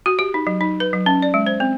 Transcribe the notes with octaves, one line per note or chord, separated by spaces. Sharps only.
F#4
G4
D#4
F#3
D#4
B4
F#3
C#4
D5
G#3
C5
C4